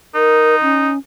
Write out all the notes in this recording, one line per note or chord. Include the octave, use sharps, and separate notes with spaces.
D#4 A#4
C#4